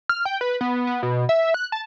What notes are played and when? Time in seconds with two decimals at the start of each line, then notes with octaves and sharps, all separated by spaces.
0.09 F6
0.25 G5
0.41 B4
0.61 B3
0.87 B3
1.03 B2
1.29 E5
1.54 F#6
1.72 A5